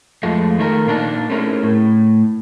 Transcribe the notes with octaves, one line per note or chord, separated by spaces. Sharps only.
F2 F3 G#3 A3
D#3 A3 D4 A#4
A#2 A#3 D4 D#4
A3 C4 C#4 E4 G#4 A#4
A2